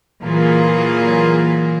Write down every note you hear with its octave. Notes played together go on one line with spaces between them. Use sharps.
A#2 E3 F#3 A#3 F4 G#4